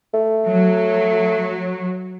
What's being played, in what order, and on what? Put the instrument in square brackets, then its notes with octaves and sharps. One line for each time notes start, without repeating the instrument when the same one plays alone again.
[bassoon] A3
[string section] F#3